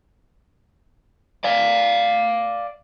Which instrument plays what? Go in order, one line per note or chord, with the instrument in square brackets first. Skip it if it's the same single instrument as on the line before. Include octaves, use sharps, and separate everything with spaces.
[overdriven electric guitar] D5 F5